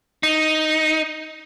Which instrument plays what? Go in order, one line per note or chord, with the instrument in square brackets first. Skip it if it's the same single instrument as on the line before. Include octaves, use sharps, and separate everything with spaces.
[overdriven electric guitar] D#4